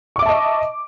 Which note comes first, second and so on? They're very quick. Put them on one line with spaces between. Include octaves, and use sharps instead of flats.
C#6 D6 E5 A5 D#5